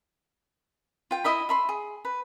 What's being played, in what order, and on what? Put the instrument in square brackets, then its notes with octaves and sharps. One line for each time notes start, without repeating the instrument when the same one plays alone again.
[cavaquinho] F4 G5
E4 D#5 E5 B5
E5 B5 C6
G#4
B4